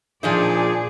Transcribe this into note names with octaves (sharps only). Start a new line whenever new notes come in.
A#2 F3 D4 D#4 G#4 D5